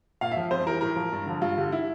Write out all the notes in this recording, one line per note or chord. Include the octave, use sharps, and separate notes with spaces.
A#2 F5
E5
F3
F2 C5
E3 G3 A#4
A2 A#4
F3
G2
D3 F3
G2 F4
D3 G3
E4